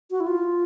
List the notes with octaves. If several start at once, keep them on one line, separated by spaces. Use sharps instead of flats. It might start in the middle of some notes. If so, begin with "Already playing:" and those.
F#4
E4
F4